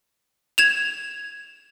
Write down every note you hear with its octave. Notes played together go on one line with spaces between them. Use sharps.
G#6 E7 F7